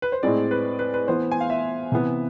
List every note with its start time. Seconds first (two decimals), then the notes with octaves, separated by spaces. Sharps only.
0.02 B4
0.12 C5
0.23 A2 G#3 C4 D5
0.51 B4
0.79 B4
0.94 B4
1.08 E3 B3 C5
1.31 G#5
1.41 F5
1.50 E5
1.92 C3 E3 B3